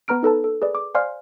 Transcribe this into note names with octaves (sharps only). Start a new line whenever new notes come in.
B3 B4 A#5 F6 D7
D#4 A4 B4 A5
A4
G#4 B4 D5
D6
C5 D5 F5 G#5 C6 F6